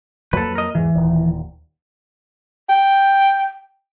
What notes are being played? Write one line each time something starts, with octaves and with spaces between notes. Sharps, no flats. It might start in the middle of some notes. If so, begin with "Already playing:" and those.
F2 F#3 A#3 A4 B4
A#4 D#5
E2 G#2 E3
D#1 D#2
G5